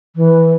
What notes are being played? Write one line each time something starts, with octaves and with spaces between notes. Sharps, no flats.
E3